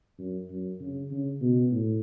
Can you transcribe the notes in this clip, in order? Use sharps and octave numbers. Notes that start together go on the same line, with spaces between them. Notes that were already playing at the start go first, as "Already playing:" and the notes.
F#2
F#2
C#3
C#3
B2
A2